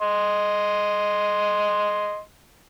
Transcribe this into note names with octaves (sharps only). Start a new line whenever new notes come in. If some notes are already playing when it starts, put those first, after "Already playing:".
D#5 C6